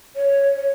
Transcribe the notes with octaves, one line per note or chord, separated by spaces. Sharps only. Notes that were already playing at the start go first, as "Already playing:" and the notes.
C#5
C#5